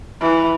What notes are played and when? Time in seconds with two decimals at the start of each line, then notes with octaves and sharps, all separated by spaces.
0.21 E3